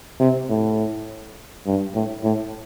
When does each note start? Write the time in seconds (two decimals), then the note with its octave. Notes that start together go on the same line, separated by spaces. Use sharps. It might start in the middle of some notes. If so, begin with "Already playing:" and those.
0.20 C3
0.49 A2
1.66 G2
1.95 A2
2.24 A2